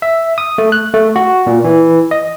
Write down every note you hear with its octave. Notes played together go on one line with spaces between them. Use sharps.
E5
D#6
A3
F#6
A3
F#4
A#2
E3
D#5